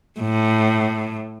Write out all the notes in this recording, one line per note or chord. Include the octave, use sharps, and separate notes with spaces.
A2